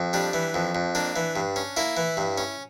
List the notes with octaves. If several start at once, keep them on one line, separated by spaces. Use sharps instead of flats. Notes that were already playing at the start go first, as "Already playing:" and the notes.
Already playing: F2
G3 D4
E3
F2
F2
A#3 D4
E3
G2
C#4
A#3 E4
E3
G2
C#4